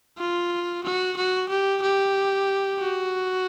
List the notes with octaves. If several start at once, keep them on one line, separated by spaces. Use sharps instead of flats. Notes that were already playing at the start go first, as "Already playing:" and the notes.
F4
F#4
F#4
G4
G4
F#4